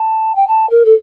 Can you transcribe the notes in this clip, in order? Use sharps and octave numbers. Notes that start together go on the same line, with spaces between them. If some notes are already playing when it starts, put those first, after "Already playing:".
Already playing: A5
G5
A5
A#4
A4